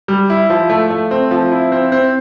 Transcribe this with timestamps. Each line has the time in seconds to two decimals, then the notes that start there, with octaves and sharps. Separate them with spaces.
0.08 G3
0.30 E4
0.50 F3
0.70 A3
0.90 A3
1.11 C4
1.31 F3
1.52 E4
1.72 C4
1.92 C4